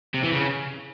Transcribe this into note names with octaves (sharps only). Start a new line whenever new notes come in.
C3
E3
C#3